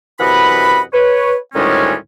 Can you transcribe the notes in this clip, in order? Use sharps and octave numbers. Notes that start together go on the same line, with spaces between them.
F#2 C3 E3 D#5 F#5 B5
B4 C#5
D2 A2 D#3 G3 G#3 C#4